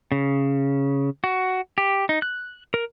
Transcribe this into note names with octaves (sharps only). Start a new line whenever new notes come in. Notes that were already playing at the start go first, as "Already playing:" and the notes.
C#3
F#4
G4
D#4
F#6
A#4